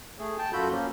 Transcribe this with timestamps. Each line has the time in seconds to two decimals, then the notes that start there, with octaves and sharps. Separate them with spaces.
0.19 A3 G#4
0.38 G5 A5
0.53 F#2 F4 F#4 A4 B5 G6
0.70 F3 A#3 C#4